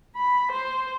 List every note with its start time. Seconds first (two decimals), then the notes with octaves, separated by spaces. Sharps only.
0.16 B5
0.52 C5